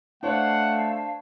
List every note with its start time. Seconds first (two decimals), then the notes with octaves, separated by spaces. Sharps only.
0.23 A3 D4 C5 C#5 F5 F#5 A5